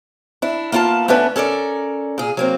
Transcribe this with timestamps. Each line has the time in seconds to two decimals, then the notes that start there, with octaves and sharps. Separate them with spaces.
0.42 D4 E4
0.72 A#3 B3 F4 F#5 A5
1.08 A3 B3 C#4 D4 B4
1.36 C#4 A4 A#4 D5
2.18 A#2 G#4
2.37 F#3 A#3 C4